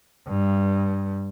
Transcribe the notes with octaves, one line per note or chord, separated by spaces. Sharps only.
G2